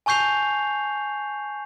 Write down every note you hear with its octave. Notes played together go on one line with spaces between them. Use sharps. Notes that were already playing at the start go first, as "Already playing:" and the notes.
G#5 A5 C#6 G6 C7 F7